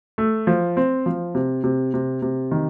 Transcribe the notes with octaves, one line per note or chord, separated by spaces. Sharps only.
A3
F3
C4
F3
C3
C3
C3
C3
D#3